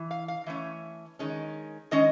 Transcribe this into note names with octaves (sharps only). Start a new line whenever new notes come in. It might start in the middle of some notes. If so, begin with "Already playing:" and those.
Already playing: E3
F5
F5
E3 A3 C#4 E5
D#3 G#3 C#4
D#3 G#3 C#4 D#5